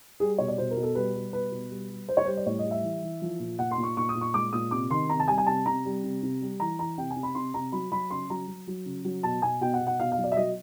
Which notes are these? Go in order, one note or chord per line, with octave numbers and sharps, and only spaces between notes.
G3 G#4
B2 C#5
D5
B2 C5
A#4
B2
A4
G3 B4
G3
B2 B4
B2
G3
G3
G3 C5
C#5
G3 C5
D5
A2 C#5
D#5
G3
E5
E3
E3
F3
A#2
A#2 F#5
C6
A#2
C#6
A#2 C#6
D#6
A#2
C#6
G#3 D6
A#2 D#6
C3 D6
D#3 C6
C3 A#5
A5
G3 G#5
G#5
C3 A5
C3 A#5
G3
C3
C3
G3
E3 A#5
E3 A#5
C3 G5
G#5
C3
B5
C3 C6
C3 A#5
F#3 B5
F#3 B5
C#3 C6
F#3 A#5
F#3
F#3
C#3
F#3
B2 A5
B2 G#5
B2 G5
F#5
B2
F#5
B2 F5
F5
F#3
D5
E5
F#3 D#5